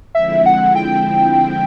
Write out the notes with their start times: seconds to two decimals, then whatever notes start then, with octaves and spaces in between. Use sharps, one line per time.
0.15 D3 F3 G#3 C4 E4 E5
0.46 F#5
0.75 G5